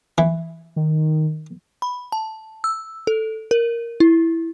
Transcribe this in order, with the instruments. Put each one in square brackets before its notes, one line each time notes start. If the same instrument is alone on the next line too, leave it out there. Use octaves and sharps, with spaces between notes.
[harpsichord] E3
[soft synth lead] D#3
[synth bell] B5
A5
E6
A4
A#4
E4